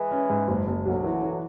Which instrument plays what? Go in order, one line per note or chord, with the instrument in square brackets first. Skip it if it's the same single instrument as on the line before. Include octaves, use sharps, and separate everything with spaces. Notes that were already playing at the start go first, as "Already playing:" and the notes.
Already playing: [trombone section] E3 G#3
[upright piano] C#4
G#2
F#1
F#1
[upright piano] B1 [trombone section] D3 F#3
[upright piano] E3
E3